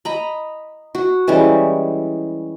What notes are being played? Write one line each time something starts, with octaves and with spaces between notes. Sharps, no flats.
D#5 A#5 B5
F#4
E3 G3 G#3 C#4